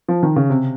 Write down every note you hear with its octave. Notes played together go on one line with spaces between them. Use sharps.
F3
D#3
C#3
C3